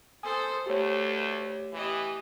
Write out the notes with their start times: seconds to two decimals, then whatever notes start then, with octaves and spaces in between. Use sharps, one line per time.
0.23 A4 C5 G#5 D#6
0.66 D2 A3 G4 C#5
1.73 E3 G4 D#5